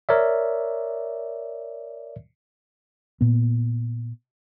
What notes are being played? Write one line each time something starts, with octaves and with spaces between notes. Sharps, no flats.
A#4 C#5 D5 E5
A#2 B3